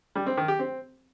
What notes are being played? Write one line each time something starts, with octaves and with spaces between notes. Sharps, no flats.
G3
C4
D#3
G4
C4